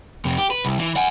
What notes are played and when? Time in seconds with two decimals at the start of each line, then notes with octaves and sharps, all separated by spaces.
0.25 F2 C3
0.38 G4
0.51 B4
0.65 C2
0.79 E3
0.96 F#5 G#5